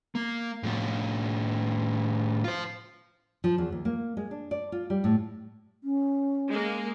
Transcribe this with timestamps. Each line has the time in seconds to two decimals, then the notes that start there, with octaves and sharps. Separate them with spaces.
0.15 A#3
0.63 A2 F3
2.44 F4 C5
3.44 F3
3.58 E2
3.72 D#2
3.85 A#3
4.17 G#3
4.31 D4
4.51 D5
4.72 F4
4.90 G3
5.04 A2
5.84 C#4
6.50 G#3 A#3